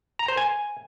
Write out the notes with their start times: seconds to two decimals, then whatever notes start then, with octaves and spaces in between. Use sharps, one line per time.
0.19 A#5
0.28 C5
0.37 G#5